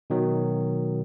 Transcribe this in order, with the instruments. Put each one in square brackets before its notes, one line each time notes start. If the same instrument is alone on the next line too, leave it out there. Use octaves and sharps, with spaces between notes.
[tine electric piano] B2 D#3 F#3